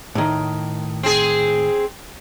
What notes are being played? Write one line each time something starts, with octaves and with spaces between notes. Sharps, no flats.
A2 D#3
C4 G#4